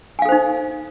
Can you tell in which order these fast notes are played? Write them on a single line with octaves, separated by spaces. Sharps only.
G#5 F5 A4 C5 D#4